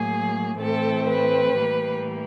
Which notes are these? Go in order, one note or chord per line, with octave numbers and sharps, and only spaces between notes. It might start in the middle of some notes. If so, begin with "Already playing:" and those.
Already playing: A2 F#3 A#3 G#4
A2 E3 A3 C4 A4
B4
A2 E3 G3 A#3